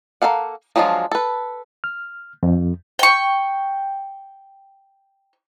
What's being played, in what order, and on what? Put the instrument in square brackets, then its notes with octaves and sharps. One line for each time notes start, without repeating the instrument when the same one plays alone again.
[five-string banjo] A#3 F4 A4 F5 F#5
F3 F#3 G#3 D4 F4
A4 B4
[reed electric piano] F6
F2
[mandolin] G5 C#6